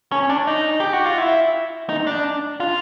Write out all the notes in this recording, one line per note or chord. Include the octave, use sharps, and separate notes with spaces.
C#4
D4
D#4
G4
F#4
F4
E4
D#4
D4
F4